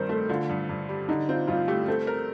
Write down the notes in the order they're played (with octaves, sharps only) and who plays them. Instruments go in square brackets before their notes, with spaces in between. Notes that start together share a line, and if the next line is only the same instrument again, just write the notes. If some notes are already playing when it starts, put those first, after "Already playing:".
Already playing: [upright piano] G2 D#3 C4 [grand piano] A#4 C5
[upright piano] A3 [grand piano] A4
[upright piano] D3 [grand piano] F4
[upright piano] G2
G2
G3
[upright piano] D3 [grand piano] D#4
[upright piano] C4 [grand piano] F4
[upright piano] G2 [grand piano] F4
[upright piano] A3 [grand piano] G4
[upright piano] C4 [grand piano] A4
[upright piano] A#4